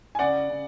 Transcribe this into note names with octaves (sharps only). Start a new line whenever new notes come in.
G#5
C#3 D5 F#5
C#3